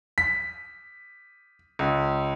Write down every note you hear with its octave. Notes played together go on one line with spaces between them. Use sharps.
B6
C#2